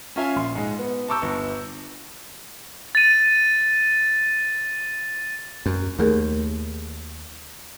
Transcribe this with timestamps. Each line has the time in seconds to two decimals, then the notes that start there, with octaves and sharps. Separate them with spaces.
0.16 C#4 F4 E5 G#5
0.36 A#1 C6
0.55 G#2 G#3
0.79 B3
1.08 A5 A#5 C#6 D6 E6 G6
1.22 G1
2.95 A6 D#7
5.66 F#2
5.99 D#2 A3 G#4 A#4